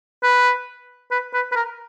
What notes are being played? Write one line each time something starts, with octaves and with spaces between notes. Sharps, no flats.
B4
B4
B4
B4
A#4